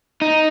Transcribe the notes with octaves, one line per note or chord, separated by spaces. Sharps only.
D#4